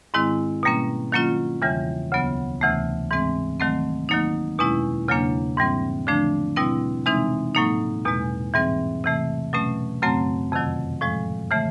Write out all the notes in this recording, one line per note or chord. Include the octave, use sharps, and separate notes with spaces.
G#2 D#3 G#3 C4 E4
B2 G3 A#3 C#4
D#3 F#3 A#3 C#4 F4
E2 C#3 E3 G3
D2 C#3 F#3 B3
D2 C3 E3 A3
G#2 E3 G#3 C4
D#3 F#3 A3 C4
D#3 F#3 A#3 D#4
E2 B2 G#3 C#4 E4
E2 C#3 F#3 A#3 D4
G#2 E3 G3 C4
D3 F3 A3 D4
B2 G3 C4 E4
C3 E3 G#3 C4 D#4
A2 F#3 A#3 D#4
E2 B2 G#3
G#2 E3 G3 C4
C3 E3 A3
B2 F#3 A3 C#4
F#2 C#3 F#3 A3 C4
F2 C3 D#3 F#3
A2 F3 G#3
C#3 E3 A3